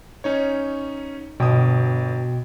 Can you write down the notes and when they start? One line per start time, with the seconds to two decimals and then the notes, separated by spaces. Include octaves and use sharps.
0.24 C#4 D#4 C#5
1.40 G1 B2 G5 D#6